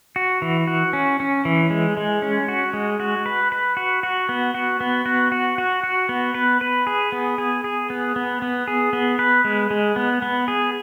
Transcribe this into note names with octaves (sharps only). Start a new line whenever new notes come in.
F#4
E3
F#4
C#4
C#4
E3
G#3
G#3
C#4
F#4
G#3
F#4
B4
B4
F#4
F#4
B3
F#4
B3
F#4
F#4
F#4
F#4
B3
B4
B4
G#4
B3
G#4
G#4
B3
B3
B3
G#4
B3
B4
G#3
G#3
B3
B3
G#4